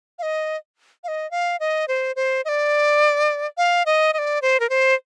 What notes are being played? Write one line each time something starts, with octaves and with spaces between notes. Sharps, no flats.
F5
D#5
F5
D#5
F5
D#5
C5
C5
D#5
D5
F5
D#5
D#5
D5
C5
A#4
C5